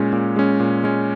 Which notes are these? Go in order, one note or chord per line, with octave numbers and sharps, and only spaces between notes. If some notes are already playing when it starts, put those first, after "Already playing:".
Already playing: A#2 G#3 C#4
A#2
G#3 C#4
A#2
G#3 C#4